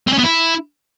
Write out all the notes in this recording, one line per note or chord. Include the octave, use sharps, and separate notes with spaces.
C4
C#4
B3
E4